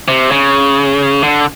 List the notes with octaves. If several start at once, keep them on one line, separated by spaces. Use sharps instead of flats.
C3
C#3
D3